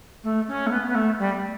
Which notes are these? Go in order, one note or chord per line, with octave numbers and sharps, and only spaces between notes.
A3
C#4
A3
B3
B3
A3
G3